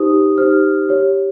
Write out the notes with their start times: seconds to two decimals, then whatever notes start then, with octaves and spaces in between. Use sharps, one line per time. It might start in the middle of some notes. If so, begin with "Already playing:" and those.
Already playing: D#4 G4 C5 D#6
0.38 D#4 G4 C5 F6
0.89 G4 C#5